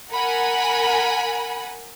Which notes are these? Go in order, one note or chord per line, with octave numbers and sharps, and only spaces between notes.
A#4 F#5 G#5 B5